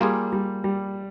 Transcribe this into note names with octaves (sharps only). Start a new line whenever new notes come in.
G3 A#3 F4 G#4
G3
G3